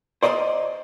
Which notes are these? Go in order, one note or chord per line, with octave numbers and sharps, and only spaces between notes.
C5 D5 D#5 B5 C6